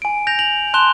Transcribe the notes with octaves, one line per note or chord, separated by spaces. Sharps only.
G#5 D7
G6 A#6 F7
F7 F#7
A5 C6 F#6 E7 G7